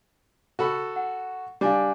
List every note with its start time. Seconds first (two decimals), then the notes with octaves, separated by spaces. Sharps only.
0.59 F#4 A4 B5
0.96 F#5
1.61 G3 D4 F5 G#5 D6